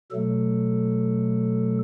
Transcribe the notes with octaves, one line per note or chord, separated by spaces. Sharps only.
B2 F#3 A3 A4